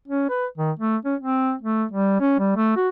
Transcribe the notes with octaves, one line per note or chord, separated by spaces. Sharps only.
C#4
B4
D#3
A3
C#4
C4
A3
G3
C#4
G3
A3
F#4